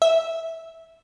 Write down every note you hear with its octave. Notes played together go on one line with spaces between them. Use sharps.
E5